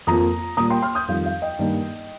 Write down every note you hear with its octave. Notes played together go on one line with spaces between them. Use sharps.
F2 F3 A#3 A#5 D#6
A#2 G3 A#3 A#5 D#6
G5 C6
C6 F6
D#6 G6
F2 D#3 G3 F5
F5
D#5 G5
G2 D#3 G3 A#3